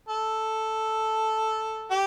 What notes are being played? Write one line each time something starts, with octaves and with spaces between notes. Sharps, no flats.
A4
G4